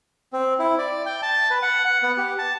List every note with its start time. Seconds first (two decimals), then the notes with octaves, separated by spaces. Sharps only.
0.33 C4
0.59 E4
0.79 D5
1.06 G5
1.23 A5
1.51 B4
1.63 F#5
1.85 F#5
2.02 B3
2.17 G4
2.38 A5